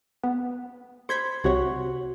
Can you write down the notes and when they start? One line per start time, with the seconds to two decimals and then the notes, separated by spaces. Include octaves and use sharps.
0.24 B3
1.09 C5 B5 G#6 C#7
1.44 C2 C3 F#4 C#5